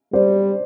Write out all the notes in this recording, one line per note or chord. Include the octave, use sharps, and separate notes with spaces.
G3 C5 D5